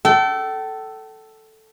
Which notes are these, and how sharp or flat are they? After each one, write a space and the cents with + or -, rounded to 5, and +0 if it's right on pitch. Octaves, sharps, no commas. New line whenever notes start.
A4 +0 G5 -40